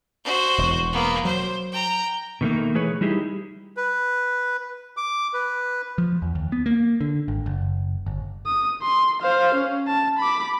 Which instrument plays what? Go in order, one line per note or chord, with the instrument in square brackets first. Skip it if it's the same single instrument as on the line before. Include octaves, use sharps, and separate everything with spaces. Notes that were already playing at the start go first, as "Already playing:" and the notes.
[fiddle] F#4 C5
[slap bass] E1
[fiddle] A#3 B3
[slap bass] F#3 [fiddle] C5
[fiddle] G5 A#5
[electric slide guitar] B2 D#3 A3 A#3
E3 A3 G#4 B4 C#5
G3 D#4 E4 G4 G#4
[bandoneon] B4
D6
B4
[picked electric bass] F3
E2
D#2
B3
A#3
D3
G#1
F#1
G1
[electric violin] D#6
C6
C5 F5
C#4
A5
B5 D6